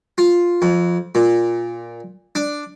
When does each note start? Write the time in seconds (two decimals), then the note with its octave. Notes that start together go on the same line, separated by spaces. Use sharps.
0.18 F4
0.62 F2
1.15 A#2
2.35 D4